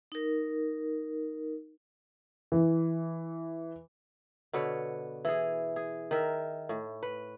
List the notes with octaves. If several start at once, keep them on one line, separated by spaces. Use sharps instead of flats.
D#4 A#4
E3
B2 D3 B4 C#5
E3 G#4
G#4
D#3 A#4 E5
A2
B4